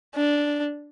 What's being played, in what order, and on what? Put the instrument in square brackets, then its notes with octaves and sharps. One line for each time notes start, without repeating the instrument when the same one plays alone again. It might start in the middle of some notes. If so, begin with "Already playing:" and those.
[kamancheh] D4